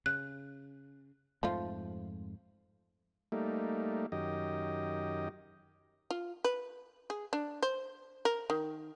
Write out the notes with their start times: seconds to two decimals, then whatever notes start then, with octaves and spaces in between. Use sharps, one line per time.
0.06 C#3 F#6
1.43 F2 G#2 F3 A3 F4
3.32 G3 A3 A#3 D#4
4.12 F#2 D#3 G4 D#5
6.11 F4
6.44 B4
7.10 G#4
7.33 D4
7.62 C5
8.25 A#4
8.50 D#3